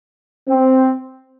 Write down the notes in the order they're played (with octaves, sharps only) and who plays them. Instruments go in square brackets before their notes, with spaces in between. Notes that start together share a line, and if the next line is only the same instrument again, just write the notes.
[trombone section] C4